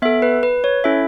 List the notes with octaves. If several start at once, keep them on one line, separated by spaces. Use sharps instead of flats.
B3 A4 E5
B4
B4
C#5
C#4 E4 A4 E5